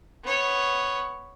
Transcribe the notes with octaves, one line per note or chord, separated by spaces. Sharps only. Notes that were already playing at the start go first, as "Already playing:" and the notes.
B3 C#5